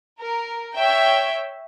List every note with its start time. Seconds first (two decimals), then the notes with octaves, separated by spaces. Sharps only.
0.20 A#4
0.75 C#5 E5 G5